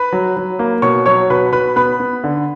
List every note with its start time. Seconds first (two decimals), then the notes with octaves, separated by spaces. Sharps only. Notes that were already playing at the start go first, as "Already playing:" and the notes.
Already playing: B4 B5
0.12 F#3
0.37 F#3
0.59 A#3
0.82 B2 C#5 C#6
1.06 F#3 C#5 C#6
1.30 B2 B4 B5
1.52 B2 B4 B5
1.76 B3 B4 B5
2.00 B3
2.24 D3